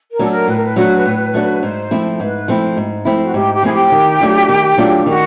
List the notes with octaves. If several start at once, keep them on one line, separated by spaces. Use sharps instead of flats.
A#4
F#3 A3 D4 F#4 A4
A#4
A2 B4
A#4
B4
F#3 A3 D4 F#4
A2
F#3 A3 D4 F#4
G#2 C5
F3 A3 C4 E4
G#2 B4
F3 A3 C4 E4
G#2
F3 A3 C4 E4
F#4
G#2 G4
G4
F3 A3 C4 E4 G#4
G4
D#3
F#3 A3 D4 F4
D#3
F#3 A3 D4 F4
D#3 F#4